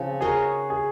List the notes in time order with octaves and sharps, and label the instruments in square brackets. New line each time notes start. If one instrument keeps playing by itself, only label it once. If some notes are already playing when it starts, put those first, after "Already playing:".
Already playing: [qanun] C#3 F3 C4 D#4
[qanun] C#4 F#4 A#4 D#5 [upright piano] G#4
[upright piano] G#4